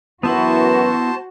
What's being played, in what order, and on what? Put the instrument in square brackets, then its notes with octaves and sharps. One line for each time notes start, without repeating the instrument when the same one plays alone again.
[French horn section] F#2 E3 [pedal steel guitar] B3 E4 B5 [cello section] F#4 [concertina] C5 A5